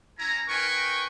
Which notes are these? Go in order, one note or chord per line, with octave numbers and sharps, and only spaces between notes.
C#4 E4 G#5 A#5
D#4 A#4 B4 G5 G#5 C#6